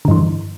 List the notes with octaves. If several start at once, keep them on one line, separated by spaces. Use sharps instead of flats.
G2 D3 E3